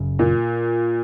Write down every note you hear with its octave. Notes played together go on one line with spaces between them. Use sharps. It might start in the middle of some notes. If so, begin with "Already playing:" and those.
Already playing: F#1 F#2 C#3
A#2